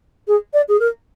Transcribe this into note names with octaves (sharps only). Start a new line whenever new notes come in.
G#4
D5
G#4
A#4